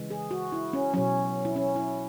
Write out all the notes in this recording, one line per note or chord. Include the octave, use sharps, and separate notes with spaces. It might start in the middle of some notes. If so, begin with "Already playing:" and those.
Already playing: C#3 E3 G#3
G#4
F#4
E4
C#4
B2 F#3 C#4
E4
C#4
E4